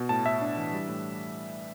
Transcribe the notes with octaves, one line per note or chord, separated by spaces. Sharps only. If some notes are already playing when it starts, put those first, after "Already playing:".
Already playing: B2
A2 A5
A2 E5
D4
E3
G3
A2